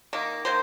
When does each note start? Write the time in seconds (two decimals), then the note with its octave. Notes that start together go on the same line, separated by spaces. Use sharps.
0.13 D#3 A#3
0.45 D#3 A#3 C5